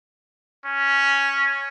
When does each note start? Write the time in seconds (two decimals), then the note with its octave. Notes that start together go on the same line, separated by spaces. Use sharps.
0.65 C#4